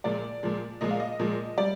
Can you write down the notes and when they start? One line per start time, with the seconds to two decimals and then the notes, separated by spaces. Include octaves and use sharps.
0.04 A#2 F3 G#3 D5
0.43 A#2 F3 G#3
0.81 A#2 F3 G#3 D#5
0.91 F5
1.00 D#5
1.19 A#2 F3 G#3
1.58 G3 D5